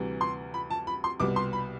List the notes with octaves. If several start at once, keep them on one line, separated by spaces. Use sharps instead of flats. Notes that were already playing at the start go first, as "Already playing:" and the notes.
Already playing: D2 C3 E3 G3
C6
B5
A5
B5
C6
C2 B2 G3 B3 D6
C6
B5